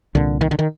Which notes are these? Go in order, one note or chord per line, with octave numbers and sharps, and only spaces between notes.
C2 A#2 D3
D#3
D3
D#3